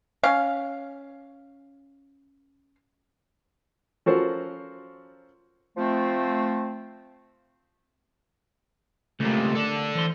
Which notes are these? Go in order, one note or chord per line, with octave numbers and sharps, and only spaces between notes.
C#4 F5
F3 C#4 F#4 A4 A#4 C5
F3 A3 C4
C#2 C3 A3 A#3
A4 D5
E3 C5 C6